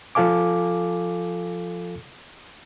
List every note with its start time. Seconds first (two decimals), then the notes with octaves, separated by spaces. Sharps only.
0.15 F3 F4 A4 F5 G#5 D6